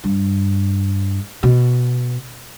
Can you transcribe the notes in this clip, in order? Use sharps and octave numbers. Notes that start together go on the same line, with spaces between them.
G2
B2